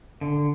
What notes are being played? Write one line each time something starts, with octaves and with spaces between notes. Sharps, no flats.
D3